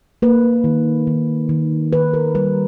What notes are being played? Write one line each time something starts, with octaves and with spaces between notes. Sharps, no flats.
A#3 B4
D#3
D#3
D#3
D#3 B4
A#4
G3 B4